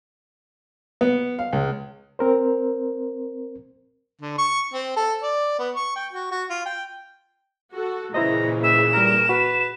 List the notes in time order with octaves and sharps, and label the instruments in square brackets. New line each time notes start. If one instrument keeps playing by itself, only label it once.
[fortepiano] B3
F5
C#2
[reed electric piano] C4 A#4 C5
[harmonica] D3
C#6
C4
A4
D5
B3
C#6
G5
F#4
F#4
F4
G5
[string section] F#4 A4
[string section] A#2 C#3 E3 [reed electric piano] E4 C5 D#5 [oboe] A#5
[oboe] E5 [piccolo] E7
[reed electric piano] G3 A#5 [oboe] A#4
[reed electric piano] F#4 [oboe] B4